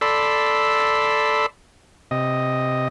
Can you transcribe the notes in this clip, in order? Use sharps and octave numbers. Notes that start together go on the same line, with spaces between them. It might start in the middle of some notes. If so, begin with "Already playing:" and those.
A4 D5 B5 C6 E6
C3 D#5